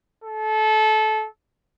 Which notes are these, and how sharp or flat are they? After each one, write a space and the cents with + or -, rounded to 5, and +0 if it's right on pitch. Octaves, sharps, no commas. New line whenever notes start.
A4 -25